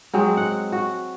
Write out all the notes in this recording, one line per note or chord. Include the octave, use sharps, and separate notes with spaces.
F#3 G#3 C4
F#5
F#4